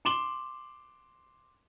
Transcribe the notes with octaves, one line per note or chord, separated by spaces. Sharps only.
C6 D6 E7 F#7 G7